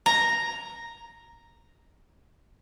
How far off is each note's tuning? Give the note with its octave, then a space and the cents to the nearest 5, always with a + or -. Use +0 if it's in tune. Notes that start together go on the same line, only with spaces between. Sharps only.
A#5 +0